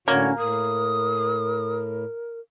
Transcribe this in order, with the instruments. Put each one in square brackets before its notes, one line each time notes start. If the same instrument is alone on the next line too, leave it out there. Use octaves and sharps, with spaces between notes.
[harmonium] A2 D3 F#4 [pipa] A#3 [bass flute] C#4 [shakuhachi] C#5
[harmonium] A2 [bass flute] A#4 [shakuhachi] D#6